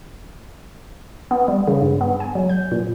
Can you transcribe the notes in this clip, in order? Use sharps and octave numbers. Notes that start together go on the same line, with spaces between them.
B3
G3
C#3
G2
B3
G#5
F#3
G6
A#2